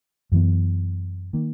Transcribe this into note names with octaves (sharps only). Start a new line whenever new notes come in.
F#2 E3 B3
D#3 A#3